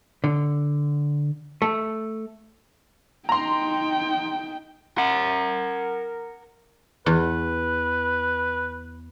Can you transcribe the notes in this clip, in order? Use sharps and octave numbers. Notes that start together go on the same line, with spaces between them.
D3
A3
D#4 G5 A#5 C6
A#4 F#5
E2 B4